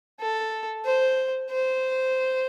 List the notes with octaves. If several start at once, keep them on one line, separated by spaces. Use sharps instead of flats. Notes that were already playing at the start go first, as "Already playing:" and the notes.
A4
C5
C5